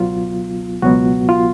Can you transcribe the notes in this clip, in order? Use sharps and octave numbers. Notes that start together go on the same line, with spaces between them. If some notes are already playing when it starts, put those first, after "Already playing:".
Already playing: C#2 B2 F#3 B3 F4
C#2 B2 F#3 B3 F#4
F4